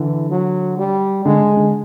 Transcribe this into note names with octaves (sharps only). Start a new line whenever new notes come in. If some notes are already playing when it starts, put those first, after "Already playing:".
Already playing: D3 E3
F#3
G3
D3 G#3
D3